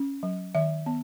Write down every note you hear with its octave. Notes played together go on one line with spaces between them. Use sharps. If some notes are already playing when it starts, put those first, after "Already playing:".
Already playing: C#4
F#3
D#3 E5
B3